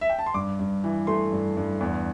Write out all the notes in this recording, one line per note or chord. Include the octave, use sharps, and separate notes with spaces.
E5
G5
A5
C6
G2 D6
G2
E3
A3 C6
G2
G2
E2